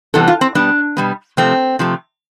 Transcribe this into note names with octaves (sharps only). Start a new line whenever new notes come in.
C3 E3 G3 B3 A4
F4
C4
B2 G3 B3 D4
B2 G3 B3
C3 F3 A3 C4
C3 F3 A3